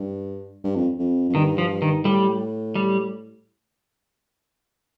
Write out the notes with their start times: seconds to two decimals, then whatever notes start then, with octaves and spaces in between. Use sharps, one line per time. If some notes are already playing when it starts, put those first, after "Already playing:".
Already playing: G2
0.64 G2
0.75 F2
0.99 F2
1.29 F2
1.35 G2 D#3
1.58 F3
1.82 D#3
2.04 A2 G3
2.75 G3